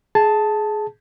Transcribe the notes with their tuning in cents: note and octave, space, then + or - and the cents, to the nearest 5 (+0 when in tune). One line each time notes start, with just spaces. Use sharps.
G#4 +20 A5 +0